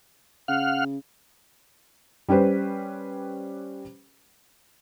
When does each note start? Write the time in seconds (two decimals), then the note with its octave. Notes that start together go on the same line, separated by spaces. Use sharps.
0.48 C#3 F5 F#5 F6
2.29 G3 C#4 G4 B4 C5